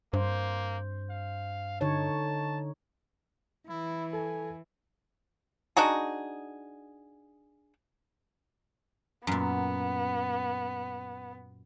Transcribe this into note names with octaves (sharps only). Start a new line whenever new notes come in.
G2 A#3 C5
F5
D3 D#4 C#5 A5
E3 E4
A4 G#5
D4 D#4 F#4 G#4
F#2 A#2 B3